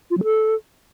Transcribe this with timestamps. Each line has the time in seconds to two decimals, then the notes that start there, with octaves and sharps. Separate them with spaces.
0.10 F4
0.17 F#3
0.24 A4